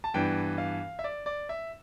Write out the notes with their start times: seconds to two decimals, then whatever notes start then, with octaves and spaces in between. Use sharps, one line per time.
0.04 A5
0.14 G2 E3 B3 D4 G5
0.58 F5
0.99 E5
1.04 D5
1.26 D5
1.49 E5